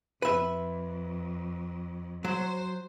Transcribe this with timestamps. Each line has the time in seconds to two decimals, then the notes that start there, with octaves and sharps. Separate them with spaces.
0.22 F2 B4 E5
2.25 F#3 C5